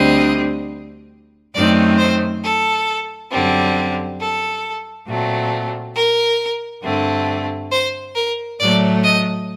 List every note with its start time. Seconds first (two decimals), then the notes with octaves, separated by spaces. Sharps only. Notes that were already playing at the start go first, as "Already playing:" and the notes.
Already playing: D2 D3 G3 C4 D#5
1.54 F#2 D#3 A3 C4 D5
1.98 C5
2.43 A4
3.31 F#2 D3 G3 C4
4.19 A4
5.07 A#2 F#3 A3 C4
5.95 A#4
6.83 G2 D3 A3 C4
7.71 C5
8.15 A#4
8.59 A2 F#3 A3 D5
9.03 D#5